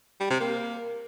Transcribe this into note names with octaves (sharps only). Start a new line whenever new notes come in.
G3
C3
A#3